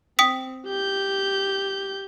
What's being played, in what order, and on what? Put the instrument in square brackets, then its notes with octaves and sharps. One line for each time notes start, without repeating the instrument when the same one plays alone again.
[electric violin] C4 [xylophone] G5 D#6 B6
[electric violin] G4 G6